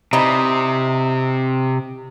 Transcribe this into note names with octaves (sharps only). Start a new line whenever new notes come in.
C3 E3 G3 D#4